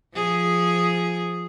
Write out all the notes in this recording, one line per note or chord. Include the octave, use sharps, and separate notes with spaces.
F3 G#4